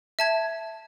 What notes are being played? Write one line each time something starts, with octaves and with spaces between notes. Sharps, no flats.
E5 A5 G#6